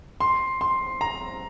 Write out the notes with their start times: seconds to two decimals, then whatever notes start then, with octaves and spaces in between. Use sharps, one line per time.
0.20 C6
0.61 C6
1.01 A#5